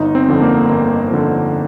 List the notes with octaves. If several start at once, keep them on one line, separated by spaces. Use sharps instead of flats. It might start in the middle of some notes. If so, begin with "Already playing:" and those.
Already playing: G1 D#4
C4
F2 D3
A#3
G1 A#3
F2 D3